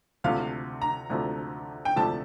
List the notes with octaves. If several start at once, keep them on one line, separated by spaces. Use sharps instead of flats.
D2 C3 F3 A3 F5
A#5
D2 C3 F3 A3
G5
D2 C3 F3 A3 A5